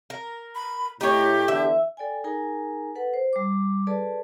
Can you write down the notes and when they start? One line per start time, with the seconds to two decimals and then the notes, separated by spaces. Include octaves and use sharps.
0.10 A#4
0.55 B5
1.01 A2 D#4 G4 C#5
1.48 E2 D3 E5
1.97 A4 D5 G5 G#5
2.24 D#4 G#4 A#4 G#5 A#5
2.95 A4 B4 F#5
3.14 C5
3.33 G3 D6
3.87 G#4 A4 B4 D5 A5